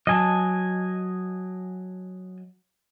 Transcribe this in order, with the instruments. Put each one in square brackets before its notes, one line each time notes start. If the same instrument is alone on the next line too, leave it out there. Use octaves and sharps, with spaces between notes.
[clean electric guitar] F#3 [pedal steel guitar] D#5 G#5 A5